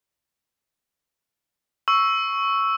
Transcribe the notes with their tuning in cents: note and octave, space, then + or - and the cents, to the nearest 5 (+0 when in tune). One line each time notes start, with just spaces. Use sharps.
C#6 +0 E6 +0